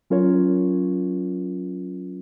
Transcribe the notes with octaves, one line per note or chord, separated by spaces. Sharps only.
F#3 C#4 F4 A#4 C#5